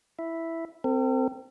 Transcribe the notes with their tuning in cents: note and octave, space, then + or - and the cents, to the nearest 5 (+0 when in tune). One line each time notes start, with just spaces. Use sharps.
E4 +0 E5 +0
C4 -10 A4 +45